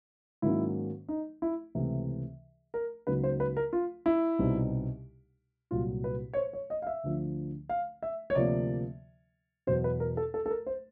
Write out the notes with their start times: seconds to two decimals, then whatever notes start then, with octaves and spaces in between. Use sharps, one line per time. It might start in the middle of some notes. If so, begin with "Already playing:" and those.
0.42 G#2 D#3 F#3 A#3 C#4 E4
1.09 D#4
1.42 E4
1.75 C#2 C3 E3 A3
2.74 A#4
3.07 C#2 C#3 F#3 A#3 D#4 B4
3.24 C5
3.40 B4
3.57 A#4
3.73 F4
4.06 E4
4.39 C2 B2 G3 C4 D#4
5.71 C2 A#2 F#3 F4
6.04 B4
6.33 C#5
6.37 C5
6.53 C#5
6.70 D#5
6.82 F5
6.87 E5
7.03 D2 D3 F3
7.69 F5
8.03 E5
8.30 C#5
8.35 D2 C3 F3 A#3 D5
9.67 E2 B2 F#3 C5
9.84 B4
10.00 A#4
10.17 A4
10.34 A4
10.46 A4
10.50 A#4
10.67 C5